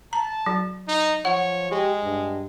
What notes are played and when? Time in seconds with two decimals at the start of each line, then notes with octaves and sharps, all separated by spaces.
0.13 A5 A#5
0.46 F#3
0.88 D#4
1.25 F3 C#5 F#5
1.71 G#3 G4
2.03 G2